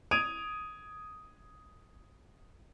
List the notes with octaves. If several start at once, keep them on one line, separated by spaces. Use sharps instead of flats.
D#6 G#6 D7 D#7 F7